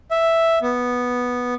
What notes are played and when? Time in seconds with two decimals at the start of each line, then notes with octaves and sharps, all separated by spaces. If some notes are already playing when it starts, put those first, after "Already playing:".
0.11 E5
0.62 B3